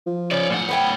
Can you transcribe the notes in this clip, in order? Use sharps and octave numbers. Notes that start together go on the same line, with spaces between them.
F3
C#3 C#5 D5
A2 F#5
B3 C#5 G5